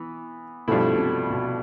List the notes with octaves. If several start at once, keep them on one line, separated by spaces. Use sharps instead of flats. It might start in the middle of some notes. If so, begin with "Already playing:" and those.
Already playing: E3 B3
G2 B2 F3 A3 E4
B2
C3
B2